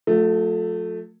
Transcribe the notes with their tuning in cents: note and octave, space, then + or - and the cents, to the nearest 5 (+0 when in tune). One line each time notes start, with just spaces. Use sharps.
F3 +45 A3 +0